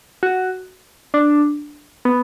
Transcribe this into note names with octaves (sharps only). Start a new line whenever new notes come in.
F#4
D4
B3